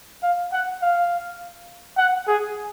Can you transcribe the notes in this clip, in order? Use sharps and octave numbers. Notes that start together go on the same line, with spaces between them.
F5
F#5
F5
F#5
G#4